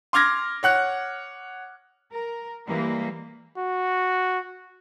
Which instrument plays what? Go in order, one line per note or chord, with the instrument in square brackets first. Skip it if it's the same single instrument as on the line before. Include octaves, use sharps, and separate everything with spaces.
[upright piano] C6 D6 F6 G#6 A#6
C#5 F#5 F#6
[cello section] A#4
E3 G3 G#3 A#3
[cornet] F#4